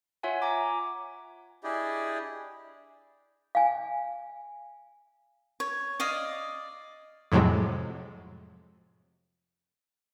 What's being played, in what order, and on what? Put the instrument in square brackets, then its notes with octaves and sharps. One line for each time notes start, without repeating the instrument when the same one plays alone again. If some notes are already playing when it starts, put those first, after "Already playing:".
[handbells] F4 C#5 E5 F#5 G#5
G#5 A#5 D6
[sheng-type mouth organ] D4 E4 G4 G#4 D5 D#5
[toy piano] F5 G#5
[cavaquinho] C#5
D5 D#5 F5 D#6
[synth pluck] F2 A2 C3 F#3 G#3